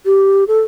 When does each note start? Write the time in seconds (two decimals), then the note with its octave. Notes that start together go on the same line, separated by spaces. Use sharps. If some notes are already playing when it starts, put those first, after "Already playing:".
0.05 G4
0.48 A4